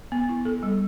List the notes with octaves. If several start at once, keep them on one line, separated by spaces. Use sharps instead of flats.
B3
E4
A4
G3